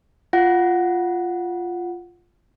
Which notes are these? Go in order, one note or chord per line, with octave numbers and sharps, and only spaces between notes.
F4 F#5